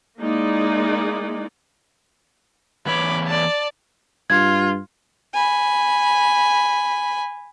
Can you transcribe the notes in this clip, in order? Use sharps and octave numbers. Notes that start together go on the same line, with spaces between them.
G#3 A#3 D#4 E4 D5
E2 E3 C#5 B5 D6
D5 A5
G2 F4 G#6
G#5 B5